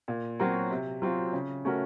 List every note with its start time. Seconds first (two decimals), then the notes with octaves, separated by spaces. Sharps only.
0.08 A#2
0.40 F#3 C4 F#4 A#4
0.71 C3
1.02 F#3 C4 F4
1.33 C#3
1.65 A3 C#4 F#4 A#4